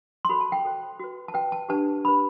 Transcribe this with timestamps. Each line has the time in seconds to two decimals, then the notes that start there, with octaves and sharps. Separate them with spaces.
0.25 C6
0.29 F#4 A4 C5 B5
0.41 A5
0.52 G5
0.65 F#4 A4 C5
0.99 F#4 B4
1.28 A5
1.34 F#4 B4 G5
1.52 A5
1.69 D4 G4 B4 A5
2.04 D4 G4 B4 B5